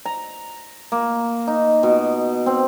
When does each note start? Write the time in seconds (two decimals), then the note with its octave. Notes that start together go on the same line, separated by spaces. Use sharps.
0.05 A#5
0.92 A#3
1.47 D#4
1.83 B2
2.46 C4